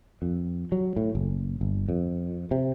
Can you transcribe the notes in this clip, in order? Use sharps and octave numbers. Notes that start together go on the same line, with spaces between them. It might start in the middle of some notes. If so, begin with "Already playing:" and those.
F2
F#3
A2
F#1
G1
F2
C3